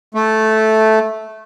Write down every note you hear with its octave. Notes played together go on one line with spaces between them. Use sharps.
A3